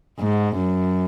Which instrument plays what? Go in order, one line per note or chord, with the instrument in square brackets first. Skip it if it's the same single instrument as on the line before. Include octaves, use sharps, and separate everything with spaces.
[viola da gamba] G#2
F#2